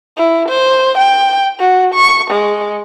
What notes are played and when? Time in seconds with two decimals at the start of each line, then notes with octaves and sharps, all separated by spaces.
0.18 E4
0.48 C5
0.97 G5
1.59 F#4
1.94 C#6
2.30 G#3